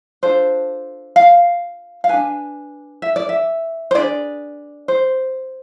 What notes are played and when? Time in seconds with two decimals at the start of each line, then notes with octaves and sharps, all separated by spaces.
0.23 D4 F4 A4 C5
1.16 F5
2.04 F5
2.09 D4 G#4 B4 G#5
3.02 E5
3.16 D5
3.29 E5
3.91 C5
3.95 D4 G#4 B4 D5
4.88 C5